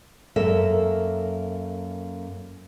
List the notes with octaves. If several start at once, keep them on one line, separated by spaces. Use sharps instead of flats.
F#2 A#3 A4 E5